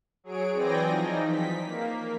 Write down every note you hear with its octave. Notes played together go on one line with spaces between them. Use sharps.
F#3 G#4 C#5 D7
E3 C4 D5 G5 G#5 A#6
F3 D#4
B6
A#3